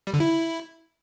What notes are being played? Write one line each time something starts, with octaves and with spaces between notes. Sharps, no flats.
G3
D3
E4